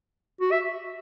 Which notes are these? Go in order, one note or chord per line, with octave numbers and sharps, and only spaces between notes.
F#4
E5